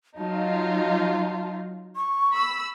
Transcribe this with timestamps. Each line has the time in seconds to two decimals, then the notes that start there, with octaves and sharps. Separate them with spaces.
0.18 F#3 D#4 F4 A5
1.96 C#6
2.35 B5 E6